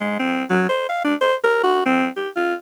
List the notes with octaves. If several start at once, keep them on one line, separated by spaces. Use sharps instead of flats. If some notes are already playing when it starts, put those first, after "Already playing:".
G#3
C4
F#3
C5
F5
D4
C5
A#4
F#4
C4
G4
F4